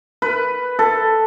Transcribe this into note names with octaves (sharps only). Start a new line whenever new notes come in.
B4
A4